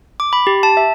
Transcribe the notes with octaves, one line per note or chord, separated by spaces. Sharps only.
D6
B5
G4
A5
E5